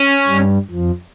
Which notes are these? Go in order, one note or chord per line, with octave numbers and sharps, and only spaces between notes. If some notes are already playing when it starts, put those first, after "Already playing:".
Already playing: C#4
G2 G3
F2 F3